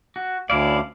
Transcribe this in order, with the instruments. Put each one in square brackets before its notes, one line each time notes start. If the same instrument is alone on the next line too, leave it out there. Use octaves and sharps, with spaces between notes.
[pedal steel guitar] F#4
[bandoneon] D2 F5 [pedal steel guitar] C#4 E4 D5